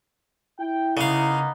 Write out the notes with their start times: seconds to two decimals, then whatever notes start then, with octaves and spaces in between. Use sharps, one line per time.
0.60 E4 G5
0.97 C#3 A#3 B3 D#4 F5